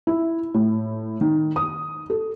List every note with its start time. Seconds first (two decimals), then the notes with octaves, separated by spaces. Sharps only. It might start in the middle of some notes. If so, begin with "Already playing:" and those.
0.07 E4
0.54 A2
1.21 D#3
1.56 D#6
2.10 A4